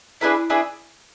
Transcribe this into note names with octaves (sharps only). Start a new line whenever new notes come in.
D4 E4 G#4 B4 E5
D4 G#4 B4 E5